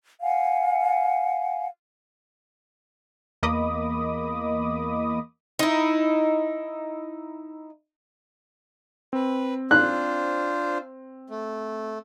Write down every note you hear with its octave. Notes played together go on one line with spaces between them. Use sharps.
F5 F#5 G#5
E2 A#3 D#5 B5 D6 D#6
D#4 E4
C4 B4
D4 F4 C5 F#6
A3